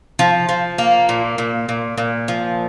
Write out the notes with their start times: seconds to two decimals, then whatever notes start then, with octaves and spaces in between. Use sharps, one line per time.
0.19 F3
0.49 F3
0.78 A#3
1.09 A#2
1.38 A#2
1.69 A#2
1.98 A#2
2.28 F3